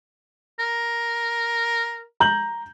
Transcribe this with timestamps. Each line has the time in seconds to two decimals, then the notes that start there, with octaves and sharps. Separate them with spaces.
0.60 A#4
2.20 A#5 G6 F#7